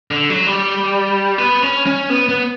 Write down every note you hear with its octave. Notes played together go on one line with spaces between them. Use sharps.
D3
F#3
G3
B3
C#4
C#4
B3
B3